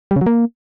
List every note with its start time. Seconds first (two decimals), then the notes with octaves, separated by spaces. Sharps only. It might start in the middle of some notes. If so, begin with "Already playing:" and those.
0.11 G3
0.16 C#3
0.21 F#3
0.26 A#3